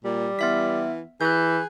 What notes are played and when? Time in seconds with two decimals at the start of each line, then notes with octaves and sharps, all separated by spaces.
0.04 A#2 G3
0.39 E3 B3 E5 B6
1.21 E3 G#4 F#6 G6